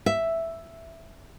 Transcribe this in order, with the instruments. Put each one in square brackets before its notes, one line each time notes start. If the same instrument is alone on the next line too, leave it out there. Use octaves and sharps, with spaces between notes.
[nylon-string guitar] E5